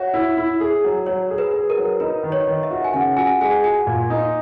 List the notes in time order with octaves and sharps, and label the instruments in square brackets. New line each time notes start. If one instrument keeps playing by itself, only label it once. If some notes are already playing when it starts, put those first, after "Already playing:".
Already playing: [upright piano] F#4 [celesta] C#5 E5
[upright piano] E4
E4
G#4
F#3
[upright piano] F#3 [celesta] C#5
[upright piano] G#4
[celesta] B4
[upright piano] G#4
[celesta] A#4
[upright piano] F#3
[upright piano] D#4 [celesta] B4
[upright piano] D#3
[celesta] C#5
[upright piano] D#3
[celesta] E5
[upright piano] F#4
[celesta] G#5
[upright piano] C#3 [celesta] F#5
[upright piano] F#4 [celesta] G#5
[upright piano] G#3 [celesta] G#5
[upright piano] F#4 [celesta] G#5
[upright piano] A#2
D#4